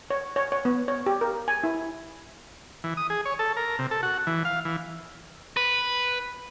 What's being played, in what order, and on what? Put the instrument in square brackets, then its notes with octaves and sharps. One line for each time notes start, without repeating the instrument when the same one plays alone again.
[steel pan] C#5
C#5
C#5
B3
C#5
G4
A#4
G#5
E4
[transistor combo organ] E3
D#6
G#4
C#5
A4
A#4
C3
A4
F#4
E3
F5
E3
[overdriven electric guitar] B4